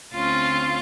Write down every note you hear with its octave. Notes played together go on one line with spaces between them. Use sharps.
D2 C4 C#4 F4 A6